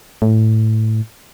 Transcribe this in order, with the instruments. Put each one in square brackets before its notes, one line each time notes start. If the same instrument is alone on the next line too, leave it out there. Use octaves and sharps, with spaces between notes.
[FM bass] A2